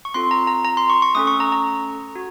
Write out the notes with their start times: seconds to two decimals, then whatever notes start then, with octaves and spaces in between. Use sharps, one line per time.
0.05 C#6
0.14 C4 F4 A4 C6
0.31 A#5
0.47 A#5
0.65 A#5
0.77 C6
0.90 C#6
1.02 C#6
1.15 A3 C#4 A4 D#6
1.27 C#6
1.40 A#5
1.52 A#5
2.15 F#4